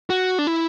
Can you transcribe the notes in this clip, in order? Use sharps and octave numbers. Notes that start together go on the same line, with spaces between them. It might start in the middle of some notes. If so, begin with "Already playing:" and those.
F#4
D4
E4